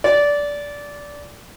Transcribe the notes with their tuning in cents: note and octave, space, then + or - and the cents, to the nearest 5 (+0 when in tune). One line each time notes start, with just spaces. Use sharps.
D5 -15